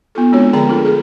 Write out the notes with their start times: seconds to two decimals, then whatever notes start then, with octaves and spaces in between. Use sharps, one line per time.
0.15 B3 D#4 F4 A4
0.32 G#3 C4 D4 F4 F#4 C#5
0.53 D3 F3 G#4 G5 A#5
0.67 A3 D4 F4 A4
0.85 G#4 A4